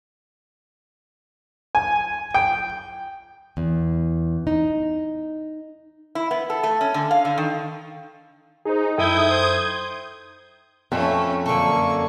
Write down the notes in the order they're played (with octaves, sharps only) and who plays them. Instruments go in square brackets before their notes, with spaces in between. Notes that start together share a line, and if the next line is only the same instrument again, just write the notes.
[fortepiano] G#5
G5
[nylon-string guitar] E2
D#4
[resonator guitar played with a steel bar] E4
B3
A4
A3
C#4
D3
F5
D3
D#3
[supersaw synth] D#4 [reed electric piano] G#4 C5
[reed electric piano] F#2 A4 G5 [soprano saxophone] E4 [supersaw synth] D#6 G6 G#6
[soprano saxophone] C5
[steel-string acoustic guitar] F2 [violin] A3 C#4
[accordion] F#2 A#3 [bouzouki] D3 A4 [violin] C#6